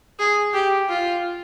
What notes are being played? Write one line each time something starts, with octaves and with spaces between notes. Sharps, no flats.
G#4
G4
F4